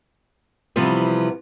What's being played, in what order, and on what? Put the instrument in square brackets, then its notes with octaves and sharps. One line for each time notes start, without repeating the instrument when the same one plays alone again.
[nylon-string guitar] C3 E3 F3 G3 B3